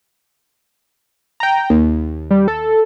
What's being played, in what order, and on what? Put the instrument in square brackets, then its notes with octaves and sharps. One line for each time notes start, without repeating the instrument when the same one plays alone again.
[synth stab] G5 A#5
D#2
[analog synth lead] G3
A4